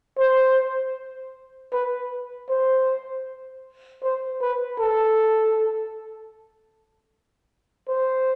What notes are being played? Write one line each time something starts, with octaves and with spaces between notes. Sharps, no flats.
C5
B4
C5
C5
B4
A4
C5